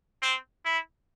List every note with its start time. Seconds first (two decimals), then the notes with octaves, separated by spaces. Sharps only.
0.22 C4
0.65 E4